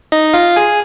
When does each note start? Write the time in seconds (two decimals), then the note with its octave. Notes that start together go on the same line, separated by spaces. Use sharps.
0.12 D#4 D#5
0.33 F4 F5
0.56 G#4 G#5